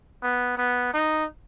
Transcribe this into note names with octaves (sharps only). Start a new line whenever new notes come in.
B3
B3
D#4